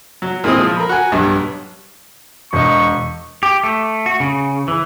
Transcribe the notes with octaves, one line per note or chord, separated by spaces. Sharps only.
F#3
A#2 E3 G#3 C4 D#6
F3
A#4 B5
F#4 G#5
B1 G2
E1 D#5 C#6
G4
A3
F#4
C#3
E3